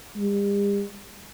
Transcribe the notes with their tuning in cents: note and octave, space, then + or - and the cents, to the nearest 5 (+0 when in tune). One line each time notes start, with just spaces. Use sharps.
G3 +45